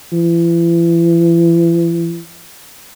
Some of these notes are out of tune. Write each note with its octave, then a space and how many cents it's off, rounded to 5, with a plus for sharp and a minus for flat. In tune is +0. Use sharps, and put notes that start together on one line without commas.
E3 +40